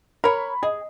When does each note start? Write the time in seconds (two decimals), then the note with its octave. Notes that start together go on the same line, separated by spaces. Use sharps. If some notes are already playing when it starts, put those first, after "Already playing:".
0.24 A#4 C#5 B5
0.63 G#4 D#5